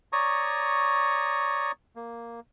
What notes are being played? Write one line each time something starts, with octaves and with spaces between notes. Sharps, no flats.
C#5 D5 A#5 C#6 D#6
A#3